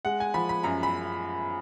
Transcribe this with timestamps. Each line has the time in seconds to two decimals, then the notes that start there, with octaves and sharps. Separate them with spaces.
0.05 G#3 F#5
0.20 G#5
0.34 F3 B5
0.49 B5
0.63 F#2 A#5
0.83 B5